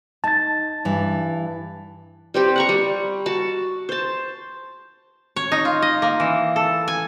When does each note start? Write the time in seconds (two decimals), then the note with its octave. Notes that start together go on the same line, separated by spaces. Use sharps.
0.24 D#4 A5 A6
0.85 G2 E3
2.34 G3 C4 G4
2.56 F#5 A#5 C#6
2.69 G3
3.26 F#4 A5
3.89 C5 A5
5.36 C#5
5.52 D#4
5.65 F4
5.82 D#5
6.02 A#3
6.20 E3
6.56 A4
6.88 G#5